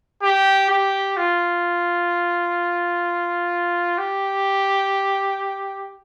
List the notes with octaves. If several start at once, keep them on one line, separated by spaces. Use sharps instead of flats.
G4
G4
F4
G4